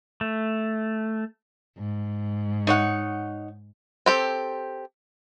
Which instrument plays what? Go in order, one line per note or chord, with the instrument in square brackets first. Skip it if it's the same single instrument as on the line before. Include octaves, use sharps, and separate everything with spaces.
[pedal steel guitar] A3
[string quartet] G#2
[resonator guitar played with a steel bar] D#4 C#5 F#5
[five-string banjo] C4 G4 A4